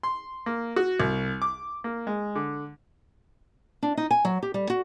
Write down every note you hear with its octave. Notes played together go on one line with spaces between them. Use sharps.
C6
A#3
F#4
C2
D6
A#3
G#3
D3
D4
D#4
G#5
F#3
G4
G3
F#4